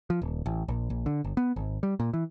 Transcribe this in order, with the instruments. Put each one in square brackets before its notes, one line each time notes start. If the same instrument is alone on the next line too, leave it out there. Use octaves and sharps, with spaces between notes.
[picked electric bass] F3
D#1
A1
A#1
A#1
D3
G1
B3
G#1
G3
A#2
E3